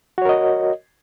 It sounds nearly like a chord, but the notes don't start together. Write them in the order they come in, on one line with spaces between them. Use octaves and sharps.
F#4 C#5 A#4 D#5